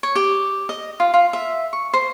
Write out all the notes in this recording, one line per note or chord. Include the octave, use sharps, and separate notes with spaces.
C#5
G4
D#5
F4
F4
E5
C#6
C5